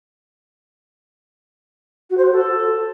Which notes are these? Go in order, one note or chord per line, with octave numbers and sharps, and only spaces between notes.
F#4
C5
F#4
A4